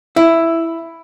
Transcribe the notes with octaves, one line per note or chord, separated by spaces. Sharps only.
E4